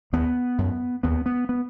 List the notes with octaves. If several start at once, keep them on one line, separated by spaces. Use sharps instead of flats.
D#2 B3
F#2
D#2 B3
B3
B3